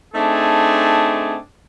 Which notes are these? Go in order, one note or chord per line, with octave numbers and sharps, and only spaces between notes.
A3 C4 D4 D#4 G#4